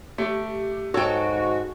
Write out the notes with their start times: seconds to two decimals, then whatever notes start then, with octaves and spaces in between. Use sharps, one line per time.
0.18 A3 G4
0.94 G#2 F#4 A4 C#5 G5